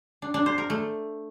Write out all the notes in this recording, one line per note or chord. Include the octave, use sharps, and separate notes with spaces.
D4
D4
C5
A#4
A3